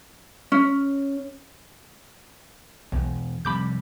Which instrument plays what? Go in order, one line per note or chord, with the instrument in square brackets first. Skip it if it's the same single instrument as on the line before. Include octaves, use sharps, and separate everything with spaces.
[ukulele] C#4
[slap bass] E1 [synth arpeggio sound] B1
[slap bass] F1 C3 G3 [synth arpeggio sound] B5 D6 G6